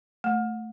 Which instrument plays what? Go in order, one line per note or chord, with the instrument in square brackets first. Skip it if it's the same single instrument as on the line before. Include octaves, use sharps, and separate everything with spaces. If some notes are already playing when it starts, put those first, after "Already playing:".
[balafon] A3